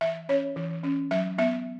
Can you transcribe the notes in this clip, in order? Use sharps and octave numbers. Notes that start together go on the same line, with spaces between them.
E3 E5
C#4 C#5
E3
C#4
F#3 E5
B3 E5